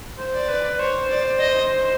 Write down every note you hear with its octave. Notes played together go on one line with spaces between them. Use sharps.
C5
D5
B4
C5 C#5
D5
D#5